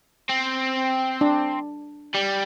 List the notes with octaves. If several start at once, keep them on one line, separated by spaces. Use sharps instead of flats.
C4
D4
G3